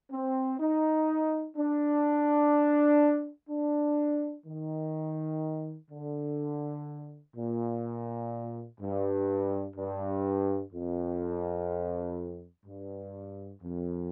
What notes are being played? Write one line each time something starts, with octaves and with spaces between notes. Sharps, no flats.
C4
D#4
D4
D4
D#3
D3
A#2
G2
G2
F2
G2
F2